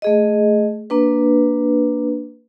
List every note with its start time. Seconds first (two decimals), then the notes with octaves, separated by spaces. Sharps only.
0.02 A3 G#4 D#5
0.90 A#3 D4 B4